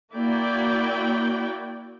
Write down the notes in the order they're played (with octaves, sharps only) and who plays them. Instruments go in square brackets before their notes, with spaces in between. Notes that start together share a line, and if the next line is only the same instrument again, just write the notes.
[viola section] A#3 E4 F#4 D5 G5